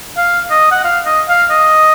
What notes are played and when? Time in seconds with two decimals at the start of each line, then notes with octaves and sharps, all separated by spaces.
0.17 F5
0.51 D#5
0.72 F#5
0.84 F5
1.06 D#5
1.29 F5
1.51 D#5